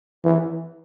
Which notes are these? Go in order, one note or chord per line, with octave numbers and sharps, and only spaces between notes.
E3